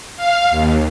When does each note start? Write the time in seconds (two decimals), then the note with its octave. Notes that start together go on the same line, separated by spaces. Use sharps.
0.17 F5
0.50 D#2